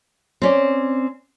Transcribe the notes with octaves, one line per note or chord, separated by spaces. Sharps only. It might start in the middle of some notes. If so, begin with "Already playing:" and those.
C4 C#4 D5